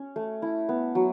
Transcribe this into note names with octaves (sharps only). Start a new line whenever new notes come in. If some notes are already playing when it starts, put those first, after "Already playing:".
Already playing: C#4
A3
E4
B3
F#3